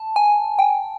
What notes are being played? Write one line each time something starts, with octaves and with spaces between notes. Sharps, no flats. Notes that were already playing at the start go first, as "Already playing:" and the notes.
Already playing: A5
G#5
G5